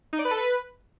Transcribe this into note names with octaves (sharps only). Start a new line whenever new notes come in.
D#4
D5
B4
A4
B4